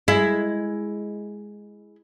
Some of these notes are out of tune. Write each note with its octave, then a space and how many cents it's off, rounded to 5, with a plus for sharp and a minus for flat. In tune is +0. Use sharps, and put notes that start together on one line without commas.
G#3 +0 E4 +5